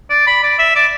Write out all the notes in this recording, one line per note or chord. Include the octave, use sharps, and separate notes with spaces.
D5
B5
D5
E5
D5